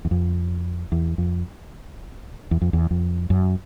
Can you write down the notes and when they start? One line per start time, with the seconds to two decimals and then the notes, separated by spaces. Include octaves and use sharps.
0.05 E2
0.11 F2
0.92 E2
1.18 F2
2.51 E2
2.62 F2
2.73 E2
2.91 F2
3.30 F#2